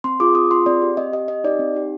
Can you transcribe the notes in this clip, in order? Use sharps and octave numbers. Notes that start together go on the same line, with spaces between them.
C4 C6
F4 G#4 D6
C4 D#6
F4 G#4 C6
C4 D5
G4
C4 D#5
G4 D#5
C4 D#5
D#4 G4 D5
C4
D#4 G4